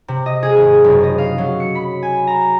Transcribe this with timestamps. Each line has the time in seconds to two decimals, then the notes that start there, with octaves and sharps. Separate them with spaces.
0.08 C3
0.26 D#5
0.43 G#4
0.56 G#1
0.84 F#1
1.03 D#5
1.18 F5
1.38 F#3
1.60 C#7
1.75 B5
2.03 G#5
2.27 A#5